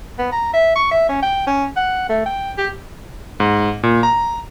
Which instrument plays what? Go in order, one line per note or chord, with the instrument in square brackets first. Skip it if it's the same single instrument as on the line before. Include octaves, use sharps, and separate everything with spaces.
[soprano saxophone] B3
A#5
E5
C#6
E5
C#4
G5
C#4
F#5
A3
G5
G4
[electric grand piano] G#2
A#2
A#5